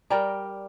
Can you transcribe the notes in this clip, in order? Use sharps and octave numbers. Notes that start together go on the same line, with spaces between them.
G3 A#4 D5 G5 A#5